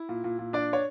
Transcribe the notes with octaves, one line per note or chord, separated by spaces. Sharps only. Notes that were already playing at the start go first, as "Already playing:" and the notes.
Already playing: E4
A#2
A#2
A#2
D4 D5
C#5